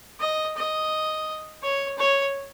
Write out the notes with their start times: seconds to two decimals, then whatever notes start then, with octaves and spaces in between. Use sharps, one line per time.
0.20 D#5
0.57 D#5
1.63 C#5
1.98 C#5